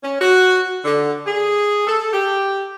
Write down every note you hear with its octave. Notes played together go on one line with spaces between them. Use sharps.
C#4
F#4
D3
G#4
A4
G4